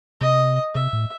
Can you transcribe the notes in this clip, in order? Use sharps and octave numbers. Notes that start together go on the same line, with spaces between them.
C3 D#5
C3 E5
A2